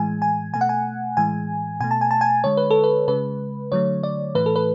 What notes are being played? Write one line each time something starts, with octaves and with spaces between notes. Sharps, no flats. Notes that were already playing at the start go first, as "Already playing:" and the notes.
Already playing: A2 E3 G#3 G#5
G#5
B2 A3 G#5
F#5
G#5
A2 E3 G#3 G#5
B2 A3 G#5
A5
G#5
A5
G#5
D3 G#3 C#5
B4
A4
B4
C#3 G#3 B4
D3 F#3 A3 C#5
D5
A2 E3 A3 B4
A4
B4